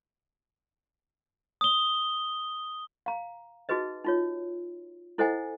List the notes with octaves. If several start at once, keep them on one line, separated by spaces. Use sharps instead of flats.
D#6 G7
F5 A#5
D#4 F#4 G#4 B4 D#5
D#4 F4 C#5
E4 A4 C5 D#5 F#5 G#5